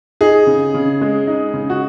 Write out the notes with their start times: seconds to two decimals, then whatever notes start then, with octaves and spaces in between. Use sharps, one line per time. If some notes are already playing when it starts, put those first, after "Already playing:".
0.21 D#4 G#4
0.47 C#3
0.74 C#3
1.01 G#3
1.27 D#4
1.54 C#3
1.70 F#4